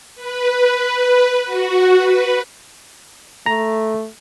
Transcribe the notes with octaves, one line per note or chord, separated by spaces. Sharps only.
B4
B4
F#4
B4
A3 A#5